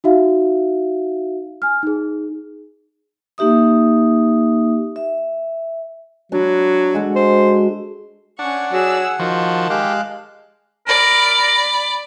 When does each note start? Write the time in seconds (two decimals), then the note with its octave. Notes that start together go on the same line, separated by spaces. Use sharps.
0.04 D#4 F#4 E5 F5
1.62 G#5 F6
1.83 D#4 G#4
3.38 A#3 D#4 G4 E5 D#6
4.96 E5
6.32 F#3 D4 B5
6.94 G#3 F#4 A4
7.16 C5
8.39 C#4 D4 F#5 C#6
8.72 F#3 G#4 E6
9.20 D#3 F3 F#4 A5
9.70 G#3 G4 F5 F#6
10.87 A#4 D5 B5